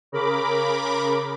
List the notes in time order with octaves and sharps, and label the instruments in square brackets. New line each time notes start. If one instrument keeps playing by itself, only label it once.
[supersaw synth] C#3 A#4 B5 D6